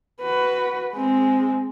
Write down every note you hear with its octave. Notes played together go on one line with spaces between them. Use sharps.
F#4 B4
G#3 C4